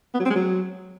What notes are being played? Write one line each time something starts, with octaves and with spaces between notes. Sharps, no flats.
B3
F#3
C4
G#3
F#3